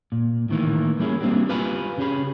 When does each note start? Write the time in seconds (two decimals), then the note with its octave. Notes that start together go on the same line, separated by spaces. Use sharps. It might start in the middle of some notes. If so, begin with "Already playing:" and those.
0.12 A#2
0.49 A2 D#3 E3 A#3
0.99 G3 A#3 C#4 E4 G4 G#4
1.20 G3 A#3 C4 D4 F#4 G4
1.48 F4 G4 B4 F5 G#5 B5
1.98 C#3 C#4 G4 G#4 B5